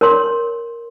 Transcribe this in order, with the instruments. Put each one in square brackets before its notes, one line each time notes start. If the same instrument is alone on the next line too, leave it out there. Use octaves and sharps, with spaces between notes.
[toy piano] A#4 C#5 C6